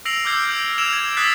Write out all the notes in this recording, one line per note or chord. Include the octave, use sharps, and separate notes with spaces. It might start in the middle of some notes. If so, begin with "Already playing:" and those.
E6 A#6 C7 D7 F7 F#7
D6 E6 F6 G6 G#6 C7
G6 D7
E6 G#6 D7 E7 F7
G#6
D#6 E6 F#6 A6 B6 C7